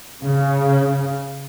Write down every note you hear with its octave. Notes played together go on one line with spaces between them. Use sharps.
C#3